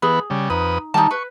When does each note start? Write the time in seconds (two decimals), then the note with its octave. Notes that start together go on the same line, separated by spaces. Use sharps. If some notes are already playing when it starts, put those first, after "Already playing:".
0.02 E3 B3 G#4 B4
0.30 C#3 G3
0.50 F2 D#4 B4 D#6
0.94 D#3 G3 D#4 A5
1.11 B4 C#6